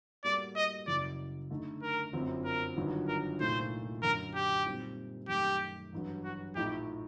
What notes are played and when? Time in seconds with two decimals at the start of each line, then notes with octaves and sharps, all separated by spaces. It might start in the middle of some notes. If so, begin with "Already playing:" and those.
0.23 A2 G3 A#3 F#4 A4 D5
0.56 D#5
0.87 F#1 F#2 F#3 D5
1.50 D3 A3 D#4 A4
1.82 A#4
2.13 G1 F#2 F#3 C4
2.45 A#4
2.76 G1 G2 D#3 F#3
3.08 A#4
3.40 C2 A#2 A3 D#4 C5
4.02 F#2 D3 F#3 A#4
4.35 G4
4.65 A#2 G3 C4 D#4
5.29 F#2 D#3 A3 G4
5.92 A1 G2 F#3
6.24 F#4
6.55 A#1 A2 A3 D#4 G4